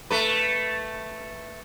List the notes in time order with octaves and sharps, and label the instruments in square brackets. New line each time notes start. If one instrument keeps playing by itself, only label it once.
[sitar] A3 B4